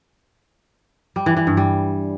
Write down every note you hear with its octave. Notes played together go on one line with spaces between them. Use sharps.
G3
E3
E3
G2
G3